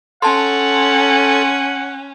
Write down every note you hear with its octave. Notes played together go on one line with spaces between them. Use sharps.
C#4 A4 F#5 A5 C6